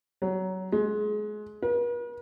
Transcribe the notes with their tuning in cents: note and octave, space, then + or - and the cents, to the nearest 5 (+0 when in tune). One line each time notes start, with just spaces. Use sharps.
F#3 +20
G#3 +25
B4 -45